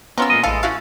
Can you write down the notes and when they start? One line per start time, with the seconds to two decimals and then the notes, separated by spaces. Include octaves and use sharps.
0.18 B3 C#4 F4 A#4 E6
0.30 A#2 G#3 D#5
0.43 A1 E3 G#3 A4 F5
0.63 C#4 E4 F#4 F5